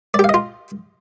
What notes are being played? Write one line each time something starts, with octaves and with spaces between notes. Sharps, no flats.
F4 G4 D5 D#5 F5